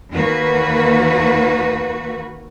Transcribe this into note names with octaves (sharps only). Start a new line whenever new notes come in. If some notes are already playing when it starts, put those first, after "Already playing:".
D#2 A#3 F#4 B4